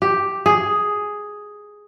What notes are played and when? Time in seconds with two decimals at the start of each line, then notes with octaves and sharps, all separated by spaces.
0.02 G4
0.46 G#4